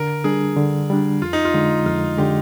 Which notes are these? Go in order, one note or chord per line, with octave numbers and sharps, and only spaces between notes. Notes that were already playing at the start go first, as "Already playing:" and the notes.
Already playing: D3 A#4
G3 D4 G#4
D3
G3 D4
F2 F4
D#4
F4
D3 G#3
F2 F4
D3 G#3 G4